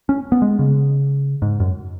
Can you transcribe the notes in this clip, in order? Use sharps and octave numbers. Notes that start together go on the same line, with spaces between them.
C#4
B3
G#3
C#3
G#2
F#2